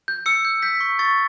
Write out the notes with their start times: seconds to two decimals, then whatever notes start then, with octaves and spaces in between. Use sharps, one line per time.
0.08 G6
0.26 E6 C#7
0.45 G6
0.62 G6 B6
0.80 C#6
0.99 C#6 A6